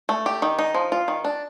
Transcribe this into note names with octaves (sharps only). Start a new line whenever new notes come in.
A3
G4
D#3
D#4
F3
F4
D#3
D4